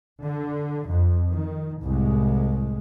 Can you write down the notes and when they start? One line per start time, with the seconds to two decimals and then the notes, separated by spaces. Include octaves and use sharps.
0.23 D3
0.91 F2
1.32 D#3
1.83 C2 A2 G#3